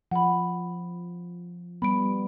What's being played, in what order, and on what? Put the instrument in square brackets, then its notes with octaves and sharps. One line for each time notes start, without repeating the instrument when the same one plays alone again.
[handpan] F3 [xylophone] F#5 B5
[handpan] G3 B3 [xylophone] B5 D7